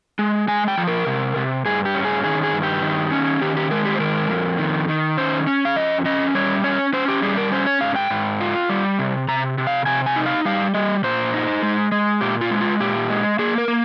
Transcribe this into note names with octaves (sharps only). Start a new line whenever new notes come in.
G#3
G#3 G#5
G5
F3
A#4
C3
C3
G2 G#4
G4
C#4
G#4
D#3 G#4
G#4
G2
G4
D#3
C#4
D#3 G4
G4
G#3 A#4
G4
C5
D#3 A#4
F2
D#3
D#3
C#4 C5
C#4
F5
F2 D#5
C#4 D#5
G3 C#5
C#4 C#5
C#4 C5
G4
G3 G#4
A#4
C#4 C5
C#5
G#2 F5
G5
G#2
F4
G3
C3
C3 A#5
C3
F5
C3 G#5
G#5
D#4
F5
G3 F5
G3 D#5
A#2 C5
D#4
G#3
G#3
A#2 G4
F4
G#3
F4
A#2 G4
G#3
A#3 G#4
A#4
A#3